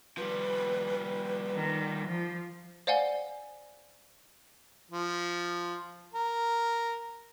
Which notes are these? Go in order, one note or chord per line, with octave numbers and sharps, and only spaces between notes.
F3 G3 B4
D#3
F3
C5 D5 F5 F#5 G#5 G7
F3
A#4